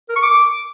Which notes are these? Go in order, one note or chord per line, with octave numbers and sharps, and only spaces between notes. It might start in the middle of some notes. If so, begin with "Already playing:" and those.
A#4
C#6
D6